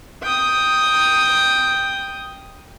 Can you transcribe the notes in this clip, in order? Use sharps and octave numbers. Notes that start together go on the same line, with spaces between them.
G5 D#6